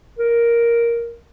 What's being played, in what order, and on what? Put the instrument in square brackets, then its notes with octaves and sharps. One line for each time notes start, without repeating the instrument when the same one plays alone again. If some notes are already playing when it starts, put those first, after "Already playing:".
[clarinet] A#4